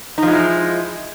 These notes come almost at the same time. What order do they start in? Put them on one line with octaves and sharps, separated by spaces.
D#4 F3 G#3 E4